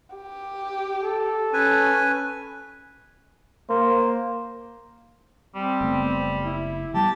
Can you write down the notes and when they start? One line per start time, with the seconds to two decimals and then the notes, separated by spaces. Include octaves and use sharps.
0.15 G4
1.03 A4
1.53 C#4 B4 G#5
3.70 A#3 C5
5.55 G3 C4
5.81 F#1 A3 B3
6.45 E4
6.94 F3 G3 B3 G4 A5